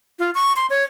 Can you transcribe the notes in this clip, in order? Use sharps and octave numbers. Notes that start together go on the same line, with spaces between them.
F4
C#6
C6
C#5